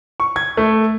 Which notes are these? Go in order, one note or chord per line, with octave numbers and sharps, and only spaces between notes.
C#6
G#6
A3